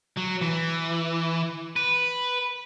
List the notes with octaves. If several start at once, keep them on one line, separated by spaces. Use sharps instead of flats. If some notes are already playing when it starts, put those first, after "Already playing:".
F#3
E3
B4